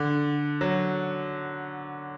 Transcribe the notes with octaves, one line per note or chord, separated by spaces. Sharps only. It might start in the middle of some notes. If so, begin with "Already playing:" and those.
Already playing: D3
F#3